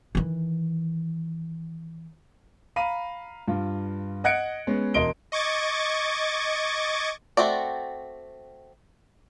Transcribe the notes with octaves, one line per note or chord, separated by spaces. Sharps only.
D#3 E3
F5 A#5 B5 D#7
G2 F4
D#5 F#5 F#6 G#6 C#7 D7
G#3 B3 C#4
E1 A#4 D#5 C6 D7 G7
D#5 C#6 D6 G#6 A6
A3 C4 F#4 D5